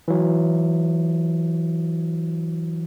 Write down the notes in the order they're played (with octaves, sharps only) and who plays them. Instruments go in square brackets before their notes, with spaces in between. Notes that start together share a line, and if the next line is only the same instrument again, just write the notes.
[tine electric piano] E3 F#3